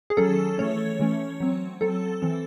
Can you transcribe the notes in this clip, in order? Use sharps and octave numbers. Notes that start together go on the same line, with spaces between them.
G#4
D#3 F#3 C#4 A4
E3 A3 C#4 C#5
E3 A3 C#4
F#3 C4
F#3 C4 A4
E3 C4